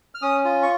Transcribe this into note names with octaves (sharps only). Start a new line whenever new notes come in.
F6
C#4 D#6
F4
C#6